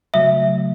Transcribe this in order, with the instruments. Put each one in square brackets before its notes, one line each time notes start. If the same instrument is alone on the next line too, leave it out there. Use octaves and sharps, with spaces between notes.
[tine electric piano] C#3 F#3 A3 [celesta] E5